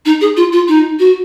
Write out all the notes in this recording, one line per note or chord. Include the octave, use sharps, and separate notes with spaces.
D#4
G#4
F4
F4
D#4
F#4